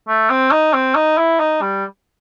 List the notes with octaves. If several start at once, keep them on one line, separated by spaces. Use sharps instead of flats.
A3
C4
D#4
C4
D#4
E4
D#4
G3